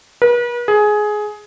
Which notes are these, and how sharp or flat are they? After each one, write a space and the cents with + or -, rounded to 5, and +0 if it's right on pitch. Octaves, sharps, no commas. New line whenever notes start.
B4 -40
G#4 +15